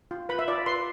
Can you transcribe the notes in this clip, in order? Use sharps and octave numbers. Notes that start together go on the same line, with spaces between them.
F4
B4 B5
E5
F4 D5
B4 C6